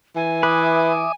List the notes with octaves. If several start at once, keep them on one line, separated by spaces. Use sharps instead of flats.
E3 G#5
B4 E5 D6 D#6